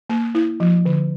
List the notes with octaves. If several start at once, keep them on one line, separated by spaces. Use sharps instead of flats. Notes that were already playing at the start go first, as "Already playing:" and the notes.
A#3
E4
F3
D3